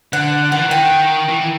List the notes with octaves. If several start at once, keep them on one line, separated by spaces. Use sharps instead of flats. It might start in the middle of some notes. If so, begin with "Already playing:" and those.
D3 F#5
D#3 F#5
E3
D#3
G5
E3